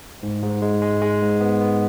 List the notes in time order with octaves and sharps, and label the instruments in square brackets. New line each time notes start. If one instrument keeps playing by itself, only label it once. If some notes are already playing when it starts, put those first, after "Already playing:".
[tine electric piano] G#2
G#2
G#3
G#3
G#3
G#2
B3
B3